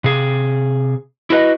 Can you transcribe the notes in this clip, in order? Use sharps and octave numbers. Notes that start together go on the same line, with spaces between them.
C3 G#4
E4 F#4 B4 D#5